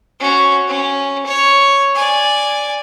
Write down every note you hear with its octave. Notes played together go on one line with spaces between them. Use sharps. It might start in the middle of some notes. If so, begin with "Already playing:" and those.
C#4 F#4
C#4
C#5
D5 G#5